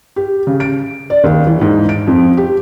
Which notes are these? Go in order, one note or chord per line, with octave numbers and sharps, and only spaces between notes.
G4
C#3
D7
D5
D#2
E3
G#2
D7
F2
G4